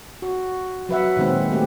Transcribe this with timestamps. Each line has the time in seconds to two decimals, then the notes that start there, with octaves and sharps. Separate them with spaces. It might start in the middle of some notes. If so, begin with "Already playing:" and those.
0.22 F#4
0.89 F#3 B4 E5 F#5
1.17 A#2 D#3 G#3 C4
1.52 A3 C4 G4